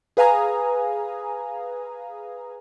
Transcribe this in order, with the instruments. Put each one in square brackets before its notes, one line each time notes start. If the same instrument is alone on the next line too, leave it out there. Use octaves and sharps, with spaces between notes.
[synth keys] G#4 B4 F5 G#5 A#5 D#6